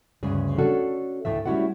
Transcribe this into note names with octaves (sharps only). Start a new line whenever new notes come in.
D2 G2 C#3 G#4
C#4 D4 F#4 A4
D2 A2 A3 E5
G3 A3 C#4 E4 F#4 F#5